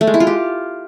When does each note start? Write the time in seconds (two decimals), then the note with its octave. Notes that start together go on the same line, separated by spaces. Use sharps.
0.01 A3
0.07 G#3
0.14 E4
0.20 F4
0.27 G4